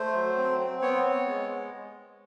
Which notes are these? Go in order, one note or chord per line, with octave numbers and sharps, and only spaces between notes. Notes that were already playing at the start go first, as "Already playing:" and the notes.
Already playing: A3 C5
F#3
C4
C4
B3 C#5
B3
G#3